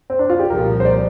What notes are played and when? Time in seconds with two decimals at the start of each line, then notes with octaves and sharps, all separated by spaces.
0.10 C4
0.19 D4
0.30 F4
0.39 G4
0.49 C2 A#2 F3 A#4
0.80 C5
0.85 D5